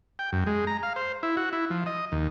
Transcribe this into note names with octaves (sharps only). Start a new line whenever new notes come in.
G5
F#2
G#3
A#5
F5
C5
E4
F#4
E4
F3
D#5
D#2